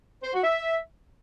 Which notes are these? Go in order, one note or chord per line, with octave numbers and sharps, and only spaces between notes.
C5
F#4
E5